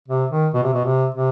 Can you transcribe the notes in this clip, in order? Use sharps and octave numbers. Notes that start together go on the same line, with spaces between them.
C3
D#3
B2
C3
B2
C3
C3